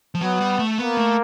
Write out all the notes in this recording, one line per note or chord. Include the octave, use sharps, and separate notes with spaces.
F3
F#3 B3
G3
A3
A#3 B3
A3